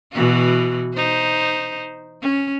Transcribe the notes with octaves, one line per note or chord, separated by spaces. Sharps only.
B2 E3 F#4
D#4 C5
C#4